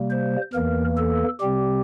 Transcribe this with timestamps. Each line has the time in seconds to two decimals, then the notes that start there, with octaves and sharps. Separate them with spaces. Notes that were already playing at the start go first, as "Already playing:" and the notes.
Already playing: C3 G3 A#3
0.10 C5
0.53 E2 E3 A#3 A#4
0.98 A4
1.41 C3 G3 C4 G4